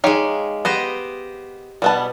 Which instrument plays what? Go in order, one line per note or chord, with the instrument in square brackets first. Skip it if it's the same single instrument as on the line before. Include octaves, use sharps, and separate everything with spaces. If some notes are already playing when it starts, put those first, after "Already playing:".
[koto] G#3 F5 [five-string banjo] D#4 G4 C#5
[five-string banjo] B3 [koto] G4 C5 D#5
[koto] B2 [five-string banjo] G3 B3 A5